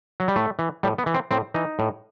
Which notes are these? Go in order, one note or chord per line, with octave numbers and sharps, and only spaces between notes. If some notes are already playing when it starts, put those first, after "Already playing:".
F#3
G3
A2 A3
E3
A2 G3
B3
E3
C4
A2 C4
E3 D#4
A2